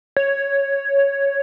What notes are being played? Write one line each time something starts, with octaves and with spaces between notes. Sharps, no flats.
C#5